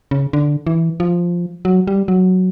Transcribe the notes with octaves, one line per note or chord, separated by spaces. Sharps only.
C#3
D3
E3
F3
F#3
G3
F#3